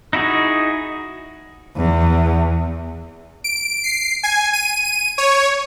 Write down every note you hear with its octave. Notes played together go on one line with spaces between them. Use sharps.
D#4 E4 F#4 G#4
E2
D7
C7
G#5
D#7
D#7
C#5